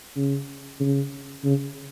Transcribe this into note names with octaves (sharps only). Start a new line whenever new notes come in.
C#3
C#3
C#3